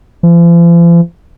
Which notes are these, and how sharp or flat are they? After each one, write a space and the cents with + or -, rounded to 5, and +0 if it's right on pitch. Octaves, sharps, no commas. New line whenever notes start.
F3 -45